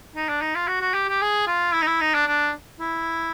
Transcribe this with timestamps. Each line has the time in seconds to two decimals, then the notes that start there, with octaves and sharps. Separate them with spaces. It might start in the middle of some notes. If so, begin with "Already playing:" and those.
0.15 D#4
0.28 D4
0.41 D#4
0.55 F4
0.67 F#4
0.81 F#4
0.94 G4
1.08 G4
1.22 G#4
1.47 F4
1.73 E4
1.82 D#4
1.87 E4
2.01 D#4
2.14 D4
2.27 D4
2.80 E4